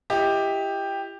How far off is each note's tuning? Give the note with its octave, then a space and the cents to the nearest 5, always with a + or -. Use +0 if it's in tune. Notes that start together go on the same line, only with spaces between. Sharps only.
E4 +35 G4 +10 D#5 +30